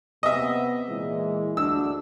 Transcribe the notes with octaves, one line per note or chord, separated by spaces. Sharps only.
C3 B3 D#5 E5
A#2 E3 G#3
D2 D4 E6